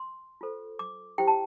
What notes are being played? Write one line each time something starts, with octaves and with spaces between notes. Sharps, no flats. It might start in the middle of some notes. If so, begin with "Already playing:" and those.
Already playing: C6
F4 A4 C5
D6
E4 G4 C5 G5
A5